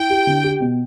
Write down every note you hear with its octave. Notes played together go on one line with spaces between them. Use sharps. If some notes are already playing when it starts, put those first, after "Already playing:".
Already playing: E4 G5
G4
D3
G4
B2